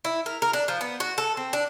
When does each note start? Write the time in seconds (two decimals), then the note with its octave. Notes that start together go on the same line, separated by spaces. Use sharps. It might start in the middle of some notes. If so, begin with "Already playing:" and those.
0.05 E4
0.26 A#4
0.42 A#4
0.53 D4
0.68 F3
0.81 B3
1.00 F#4
1.18 A4
1.37 C4
1.53 D4